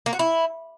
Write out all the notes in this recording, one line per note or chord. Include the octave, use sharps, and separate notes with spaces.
A#3
F#4
E4